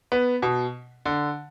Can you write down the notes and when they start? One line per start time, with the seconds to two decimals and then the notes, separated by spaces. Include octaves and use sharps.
0.12 B3
0.42 B2
1.06 D3